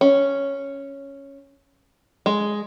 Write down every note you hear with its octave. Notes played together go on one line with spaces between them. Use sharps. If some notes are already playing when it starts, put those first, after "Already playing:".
C#4
G#3